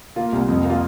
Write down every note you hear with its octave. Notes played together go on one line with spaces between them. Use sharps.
A#3 F4
C2
F2
A#3
F4